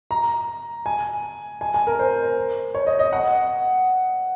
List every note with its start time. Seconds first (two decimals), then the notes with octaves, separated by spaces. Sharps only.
0.11 A#5
0.86 G#5
1.61 G#5
1.74 G#5
1.87 A#4
1.99 C5
2.75 C#5
2.87 D#5
2.99 D#5
3.13 F#5